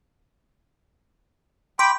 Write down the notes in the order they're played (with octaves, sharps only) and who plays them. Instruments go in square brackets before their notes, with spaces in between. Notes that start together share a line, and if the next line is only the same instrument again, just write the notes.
[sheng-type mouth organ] G5 B5 D6 [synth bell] C6